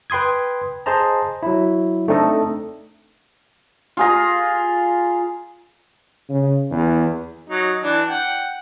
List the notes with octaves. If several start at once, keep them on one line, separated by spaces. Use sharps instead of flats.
B4 G5 C6 D#6 G#6
G#4 C5 D#5 A5 A#5
F#3 E4
A3 C4 D4 D#4 A4 D#5
F4 G#4 A#5
C#3
E2
F#3 D#4
E3 D4
F#5 G5